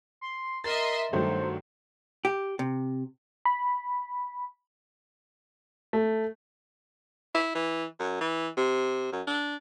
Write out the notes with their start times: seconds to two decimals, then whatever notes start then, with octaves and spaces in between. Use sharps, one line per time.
0.21 C6
0.64 A#4 D#5 E5 C6 A6
1.13 G2 D#3 F#3 A3 C5
2.25 G4
2.59 C3
3.45 B5
5.93 A3
7.35 E4
7.55 E3
8.00 F#2
8.21 E3
8.57 C3
9.12 F#2
9.27 D4